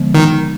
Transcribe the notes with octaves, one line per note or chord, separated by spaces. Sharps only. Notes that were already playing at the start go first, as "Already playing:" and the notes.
Already playing: D3 F3 G#3 B3
D#3